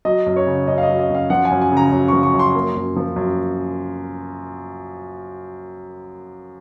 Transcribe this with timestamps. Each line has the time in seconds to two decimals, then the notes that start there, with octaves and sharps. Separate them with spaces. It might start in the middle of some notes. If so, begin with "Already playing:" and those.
0.05 F#3 D#5
0.26 F#2
0.36 C#5
0.47 C#3
0.67 F#2 D#5
0.78 F5
0.83 D#5
0.89 F#3
0.99 D#5
1.09 F#2
1.15 F5
1.30 F3 F#5
1.45 G#5
1.51 F#2
1.61 G#5
1.72 C#3
1.77 A#5
1.92 F#2
2.08 F3 C#6
2.23 C#6
2.34 F#2
2.39 C6
2.55 A#3
2.76 F#2
2.96 F3
3.16 F#2